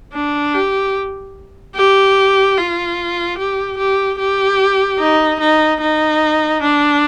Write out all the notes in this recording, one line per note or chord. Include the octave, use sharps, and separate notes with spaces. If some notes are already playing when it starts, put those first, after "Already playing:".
D4
G4
G4
F4
G4
G4
G4
D#4
D#4
D#4
D4